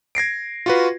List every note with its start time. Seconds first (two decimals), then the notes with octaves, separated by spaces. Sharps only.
0.15 G#6 A#6 C7 D7
0.66 F4 F#4 B4